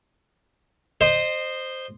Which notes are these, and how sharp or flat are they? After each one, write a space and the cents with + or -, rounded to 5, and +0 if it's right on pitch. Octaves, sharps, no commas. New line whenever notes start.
C5 +0 D#5 -25